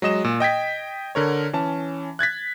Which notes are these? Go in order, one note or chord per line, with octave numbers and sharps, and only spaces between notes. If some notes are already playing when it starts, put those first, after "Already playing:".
F#3 G#3 D#5 E7
A#2
D#5 G5 G#6 B6
D3 A#4 C#5
E3 C#4 A5
F#6 G#6 A6 B6